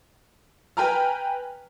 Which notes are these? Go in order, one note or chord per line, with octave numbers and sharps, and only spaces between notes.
B4 G5 G#5 A#5 F6